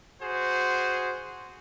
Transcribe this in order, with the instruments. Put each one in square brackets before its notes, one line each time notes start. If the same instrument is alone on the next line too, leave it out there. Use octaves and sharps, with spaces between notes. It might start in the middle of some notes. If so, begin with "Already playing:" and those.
[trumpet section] F#4 G#4 C5